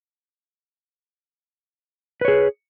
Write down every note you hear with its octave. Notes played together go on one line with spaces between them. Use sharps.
G#4 B4 C#5